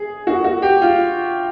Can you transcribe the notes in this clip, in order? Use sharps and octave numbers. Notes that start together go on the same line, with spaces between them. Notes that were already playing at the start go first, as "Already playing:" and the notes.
Already playing: G#4
F#4
F#4
G4
F4